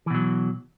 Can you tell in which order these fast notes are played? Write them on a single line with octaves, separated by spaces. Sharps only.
E3 B2 F#3